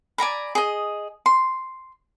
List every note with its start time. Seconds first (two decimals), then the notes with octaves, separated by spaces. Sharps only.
0.18 D5 G#5 A#5 B5
0.55 G#4 D#5
1.26 C6